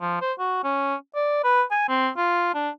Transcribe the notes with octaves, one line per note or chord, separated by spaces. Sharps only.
F3
C5
F#4
C#4
D5
B4
G#5
C4
F4
D4